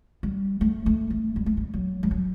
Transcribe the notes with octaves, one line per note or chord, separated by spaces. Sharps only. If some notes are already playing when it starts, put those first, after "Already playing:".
G3
A3
A3
A3
G3
A3
G3
F#3
G3
F#3